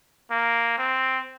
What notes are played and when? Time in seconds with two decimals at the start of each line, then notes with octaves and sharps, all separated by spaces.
0.31 A#3
0.78 C4